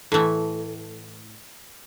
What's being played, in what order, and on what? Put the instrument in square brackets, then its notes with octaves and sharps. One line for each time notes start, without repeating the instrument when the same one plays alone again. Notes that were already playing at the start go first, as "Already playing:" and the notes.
[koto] A2 E3 A3